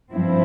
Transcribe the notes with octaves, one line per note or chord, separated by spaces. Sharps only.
G2 F3 C4 E4